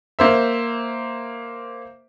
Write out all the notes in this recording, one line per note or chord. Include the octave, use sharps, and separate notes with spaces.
A#3 C5 E5